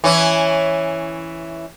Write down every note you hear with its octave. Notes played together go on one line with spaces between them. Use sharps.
E3 C#4 E4